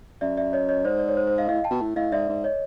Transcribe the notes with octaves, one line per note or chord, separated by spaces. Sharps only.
F#2 D5 E5
D5 E5
C#5 D#5
C#5 D#5
G#2 C5 D5
D5
C#5
C5
C5
D#5 F5
A2 D#5 F5
G5 A5
B2
A2
A2 D#5 F5
G#2 D5 E5
G#2
C#5 D#5